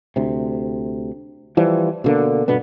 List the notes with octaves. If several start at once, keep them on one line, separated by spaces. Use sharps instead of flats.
D2 C3
E3 F3 G3
B2 D3 A#3
G1 B2 D3 B3